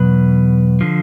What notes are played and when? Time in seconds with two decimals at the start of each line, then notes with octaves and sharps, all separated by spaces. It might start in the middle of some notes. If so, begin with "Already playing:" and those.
Already playing: E2 B2 F#3 B4
0.81 D3 F3